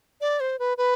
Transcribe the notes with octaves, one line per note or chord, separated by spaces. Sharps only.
D5
C5
B4
B4